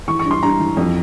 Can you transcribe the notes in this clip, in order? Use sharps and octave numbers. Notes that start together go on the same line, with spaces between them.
E3 C#6
C#6
G2
C6
G2 A#5
E3
F2